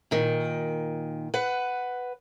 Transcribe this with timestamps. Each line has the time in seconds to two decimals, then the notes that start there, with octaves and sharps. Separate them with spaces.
0.11 A#2 D#3
1.34 B4 F#5